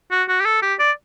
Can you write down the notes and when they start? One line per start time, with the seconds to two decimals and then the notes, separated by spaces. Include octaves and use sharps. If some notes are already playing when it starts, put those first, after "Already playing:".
0.11 F#4
0.28 F#4
0.40 G4
0.45 A4
0.62 G4
0.79 D5